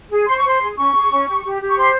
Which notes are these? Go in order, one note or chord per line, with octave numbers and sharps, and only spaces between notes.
G#4
C5 C6
C#6
C5 C6
G#4
C#4 C#6
G#4
C#4
G4
G4
G4
C#6
C5 C6